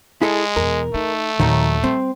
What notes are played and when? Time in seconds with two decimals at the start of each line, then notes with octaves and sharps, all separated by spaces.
0.22 G#3 E4 G#4 A4
0.56 E2 B2 A#4
0.94 A3 D#4
1.40 D#2 A#2 D#3 F#3 D#4
1.84 G3 C4